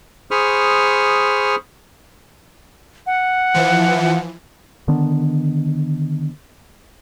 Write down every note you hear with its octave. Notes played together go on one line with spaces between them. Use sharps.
G#4 C5 B5 C#6 D#6 F6
F#5
E3 F3
D3 D#3 B3 D4